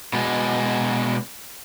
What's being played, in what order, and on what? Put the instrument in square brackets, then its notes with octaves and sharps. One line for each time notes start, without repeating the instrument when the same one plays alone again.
[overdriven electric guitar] B2 G#3